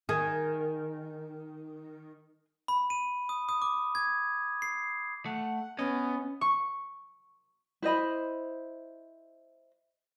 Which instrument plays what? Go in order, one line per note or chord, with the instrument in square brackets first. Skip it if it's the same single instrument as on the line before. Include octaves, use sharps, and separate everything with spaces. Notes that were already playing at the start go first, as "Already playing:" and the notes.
[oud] D#3 [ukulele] G#4
[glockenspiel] B5
D#7
D#6
D#6
D6
G#6
C7
[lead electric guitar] A3 [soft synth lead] F#5
[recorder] B3 [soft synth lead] C#4 [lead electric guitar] C#5 D#5
[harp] C#6
[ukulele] E4 C5 D#5 B5